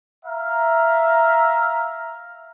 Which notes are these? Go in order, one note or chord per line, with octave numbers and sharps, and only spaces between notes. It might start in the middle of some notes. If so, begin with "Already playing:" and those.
E5 F5 A#5